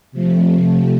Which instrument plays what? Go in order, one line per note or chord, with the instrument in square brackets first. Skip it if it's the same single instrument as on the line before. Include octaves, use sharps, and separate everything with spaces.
[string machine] C3 F3 A3